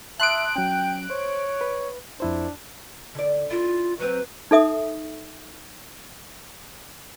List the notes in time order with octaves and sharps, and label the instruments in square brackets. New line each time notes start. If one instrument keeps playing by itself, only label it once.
[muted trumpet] E5 [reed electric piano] A5 C6 D#6 [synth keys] F#6 D7
[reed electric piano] F#3 C#4 [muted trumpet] G5
[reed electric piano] C5 [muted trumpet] C#5
[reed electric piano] B4
[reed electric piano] F2 E4 C5 [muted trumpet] D4
[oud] D3 D5
[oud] E4 [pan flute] F4
[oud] F#3 C4 [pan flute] B4
[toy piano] D#4 A4 E5 D#6